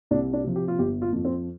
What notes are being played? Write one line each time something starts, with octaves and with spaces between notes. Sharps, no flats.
C2 D4
D4
C3 F3
G4
F4
G1 G4
F4
F2 F3
C4